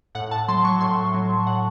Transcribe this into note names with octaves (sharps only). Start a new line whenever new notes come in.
A2 F#5
A2 A5
F#3 C6
F#3 C#6
A2 C6
A2
F#3
F#3
A2 F#5